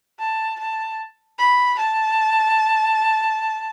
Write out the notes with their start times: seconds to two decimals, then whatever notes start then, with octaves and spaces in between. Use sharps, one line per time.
0.19 A5
0.59 A5
1.38 B5
1.78 A5